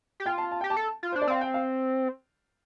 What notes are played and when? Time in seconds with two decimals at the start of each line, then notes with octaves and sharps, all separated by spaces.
0.20 G4
0.26 F4 G5
0.38 A5
0.51 A5
0.61 G4 G5
0.70 A5
0.77 A4
1.03 F4
1.12 D4 C5
1.22 D5
1.27 C4 F5
1.41 G5
1.54 F5